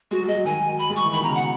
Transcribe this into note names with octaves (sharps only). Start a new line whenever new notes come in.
G#3 F#4
F#3
G#3 D#5
F#3
D#3 G#5
B5
G#3
F#3 C#6
E3
D#3 B5
B2
A#5
C#3
F#5